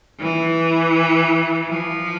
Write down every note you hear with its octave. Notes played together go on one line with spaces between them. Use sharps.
E3
F3